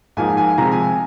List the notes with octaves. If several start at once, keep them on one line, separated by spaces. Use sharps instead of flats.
G#2 F3 A#3 D#4 G#5
G#5
C3 F3 G#3 A#5
G#5